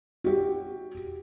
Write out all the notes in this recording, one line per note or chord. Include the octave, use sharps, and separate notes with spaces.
F#4 G4